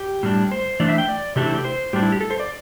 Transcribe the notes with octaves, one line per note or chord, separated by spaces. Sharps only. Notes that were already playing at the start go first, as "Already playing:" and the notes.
Already playing: G4
A2 G3 D4
C5
E3 A3 D4 D5
E5
G5
D5
C3 E3 A3 D4 G4
E4
G4
C5
A2 G3 D4 G4
E4
G4
A4
C5
D5